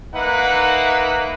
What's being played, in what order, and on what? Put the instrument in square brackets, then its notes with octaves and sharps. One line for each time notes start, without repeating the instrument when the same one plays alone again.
[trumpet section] A#3 D#4 B4 E5 F#5